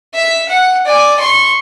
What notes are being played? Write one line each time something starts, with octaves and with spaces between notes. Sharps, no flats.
E5
F#5
D5 G#5
C6 C#6